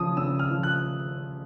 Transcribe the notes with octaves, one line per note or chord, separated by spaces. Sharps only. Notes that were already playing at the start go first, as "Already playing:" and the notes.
Already playing: C#3 F3 D#6
C#3 E6
F6
F3
F#6